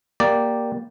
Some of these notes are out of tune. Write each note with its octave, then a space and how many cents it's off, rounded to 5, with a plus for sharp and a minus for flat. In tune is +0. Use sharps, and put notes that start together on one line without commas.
A#3 +5 G4 +0 D5 +0